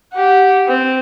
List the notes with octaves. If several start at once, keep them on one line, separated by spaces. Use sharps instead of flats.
G4 F#5
C4